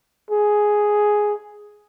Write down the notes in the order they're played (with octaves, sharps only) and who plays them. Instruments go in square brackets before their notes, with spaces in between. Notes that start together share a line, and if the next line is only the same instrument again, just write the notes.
[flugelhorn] G#4